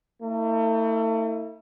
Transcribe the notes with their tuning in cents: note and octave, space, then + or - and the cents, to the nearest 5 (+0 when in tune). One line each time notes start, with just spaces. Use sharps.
A3 +40 E4 -30